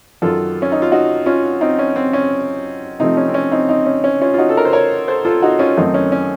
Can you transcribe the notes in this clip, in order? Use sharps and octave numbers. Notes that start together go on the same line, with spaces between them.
F#2 D#3 F#3 F4 A4
C#4
D#4
F4
D#4 F#4
C#4 F4
C4 D#4
C#4
C4
C#4
C3 F3 A3 C4 D#4
C#4
C4
C#4
C4 D#4
C4 D#4
C#4
C#4
C#4 F4
F4
D#4 F#4
A4
A#4
C5
A#4 C#5
A4 C5
F4 A4
D#4 F#4
C#4 F4
F#2 D#3 A3 C4 D#4
C#4
C#4